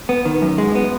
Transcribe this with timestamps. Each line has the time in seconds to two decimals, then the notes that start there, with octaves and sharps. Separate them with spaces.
0.09 B3
0.25 D#3
0.42 F#2
0.58 G#3
0.75 B3